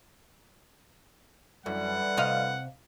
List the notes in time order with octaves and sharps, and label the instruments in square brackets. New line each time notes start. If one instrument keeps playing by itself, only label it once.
[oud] F#2 [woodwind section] D3 E3 G3 [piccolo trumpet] F#5
[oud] C3 D#5 F5